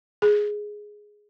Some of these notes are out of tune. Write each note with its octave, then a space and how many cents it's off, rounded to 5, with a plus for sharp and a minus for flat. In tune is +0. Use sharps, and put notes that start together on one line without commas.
G#4 +5